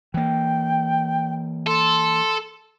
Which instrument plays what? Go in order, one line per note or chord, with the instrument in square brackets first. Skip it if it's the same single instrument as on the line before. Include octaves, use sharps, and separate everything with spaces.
[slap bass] E3 A#3 [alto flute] G5
[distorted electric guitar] A4 [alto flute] C6